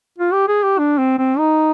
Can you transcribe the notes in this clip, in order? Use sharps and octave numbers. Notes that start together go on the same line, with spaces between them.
F4
G4
G#4
G4
D4
C4
C4
D#4